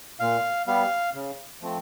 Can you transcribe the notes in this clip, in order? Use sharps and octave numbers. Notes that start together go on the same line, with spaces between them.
A#2 F5
G3 B3 F5
C#3
F3 A3 C4